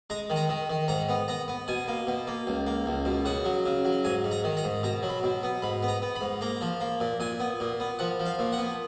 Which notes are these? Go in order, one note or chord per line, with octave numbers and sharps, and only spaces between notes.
G#3 A#5
D#3
A#5
D#3
D#3
G#2 A#5
B3
B3 A#5
B3
B2 G#5
A#3
B2
A#3
C#2
A#3
C#2
B2
C#3 F#5
F#3
C#3
F#3
G#2 G#5
G#2
A#5
D#3
A#5
G#2
B2 A#5
F#3
B5
B2
B3
G#2 B5
B3
A#5
B3
B5
G#2
A#3 A#5
F3
A#3
A#2
A#2 G#5
B3
A#2
B3
F3 F#5
F3
F5
A#2
F#5
B3